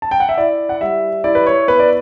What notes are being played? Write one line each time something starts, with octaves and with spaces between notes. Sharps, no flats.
A5
G5
F#5
E5
E4 D5
F#5
G3 E5
E4 D5
B4
C#5
B3 B4
D5